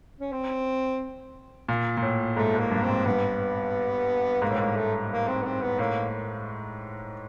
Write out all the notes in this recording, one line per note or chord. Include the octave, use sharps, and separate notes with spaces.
C#4
C4
A#2
A#2
A2
G#2 A3
G#2 A#3
G2
C4
G#2
G2 B3
G#2 A#3
A2
G#2 A#3
A3
A#3
C4
B3
C4
B3
A2 A#3